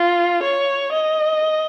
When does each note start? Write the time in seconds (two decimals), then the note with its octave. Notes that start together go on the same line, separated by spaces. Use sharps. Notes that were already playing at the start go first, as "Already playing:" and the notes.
Already playing: F4
0.43 C#5
0.93 D#5